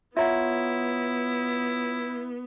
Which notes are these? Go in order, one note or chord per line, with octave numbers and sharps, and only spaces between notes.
B3 E4 F4 C#5 E5 F#5 A#5